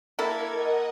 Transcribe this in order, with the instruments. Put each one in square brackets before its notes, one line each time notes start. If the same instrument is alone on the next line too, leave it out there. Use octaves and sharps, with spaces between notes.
[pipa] A#3 E4 A4 [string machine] A#4 G#6
[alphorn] A#4 [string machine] D#5 F#5